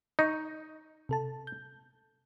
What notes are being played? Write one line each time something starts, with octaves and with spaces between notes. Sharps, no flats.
D#4 D#5 C#6
C3 A4 A5
G6